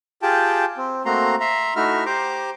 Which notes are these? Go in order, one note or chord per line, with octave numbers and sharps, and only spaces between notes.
F4 G4 G#4 G5 A5
C4
A3 A#3 C4 F#4 A#5 C6
E5 A#5 C6
A3 D#4 E4 F#4 E5 F6
G4 C5 A#5 C6 D6